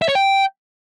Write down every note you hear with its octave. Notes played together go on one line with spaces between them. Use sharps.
E5
C#5
G5